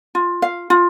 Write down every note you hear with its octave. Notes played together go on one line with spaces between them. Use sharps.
F4
F5
F4